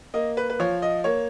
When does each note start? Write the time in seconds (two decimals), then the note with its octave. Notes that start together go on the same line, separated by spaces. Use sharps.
0.14 A#3 D#5
0.37 B4
0.50 B4
0.60 F3 C#5
0.82 D#5
1.04 A#3 C#5